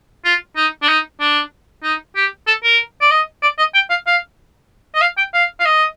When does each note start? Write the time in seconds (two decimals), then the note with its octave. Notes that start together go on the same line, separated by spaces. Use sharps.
0.25 F4
0.56 D#4
0.82 D4
0.88 D#4
1.20 D4
1.83 D#4
2.16 G4
2.47 A4
2.63 A#4
3.01 D5
3.11 D#5
3.42 D5
3.58 D#5
3.74 G5
3.90 F5
4.07 F5
4.95 D#5
5.01 F5
5.17 G5
5.34 F5
5.60 F5
5.65 D#5